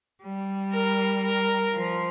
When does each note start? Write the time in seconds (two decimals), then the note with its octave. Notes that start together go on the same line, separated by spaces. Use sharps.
0.22 G3
0.72 A#4
1.23 A#4
1.74 F3